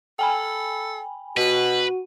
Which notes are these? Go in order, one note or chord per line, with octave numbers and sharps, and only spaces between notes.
A4 G5 G#5 B5
B2 F#4 B4